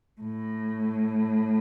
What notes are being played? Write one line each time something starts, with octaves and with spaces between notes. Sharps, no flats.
A2